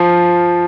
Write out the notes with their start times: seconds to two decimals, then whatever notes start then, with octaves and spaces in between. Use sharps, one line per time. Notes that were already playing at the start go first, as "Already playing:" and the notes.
Already playing: F3